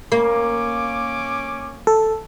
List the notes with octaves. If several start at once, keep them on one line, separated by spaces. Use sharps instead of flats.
A#3 C#4 D6
A4